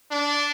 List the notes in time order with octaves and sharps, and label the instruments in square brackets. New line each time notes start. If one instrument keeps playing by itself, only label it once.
[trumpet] D4